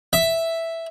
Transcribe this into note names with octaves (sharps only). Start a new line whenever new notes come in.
E5